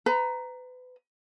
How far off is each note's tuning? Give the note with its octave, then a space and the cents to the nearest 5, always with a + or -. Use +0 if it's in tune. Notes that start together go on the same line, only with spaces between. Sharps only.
B4 +30 A#5 +0